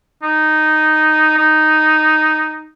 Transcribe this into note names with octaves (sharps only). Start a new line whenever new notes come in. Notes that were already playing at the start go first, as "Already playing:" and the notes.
D#4
D#4